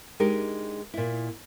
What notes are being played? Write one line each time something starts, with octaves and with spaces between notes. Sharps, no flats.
G#3 D4 D#4 G4 A#4
A#2 E4